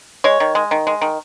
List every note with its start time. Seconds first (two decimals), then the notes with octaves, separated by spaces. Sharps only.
0.24 G#3 C#5
0.40 D#3
0.55 G#3
0.71 D#3
0.87 G#3
1.02 D#3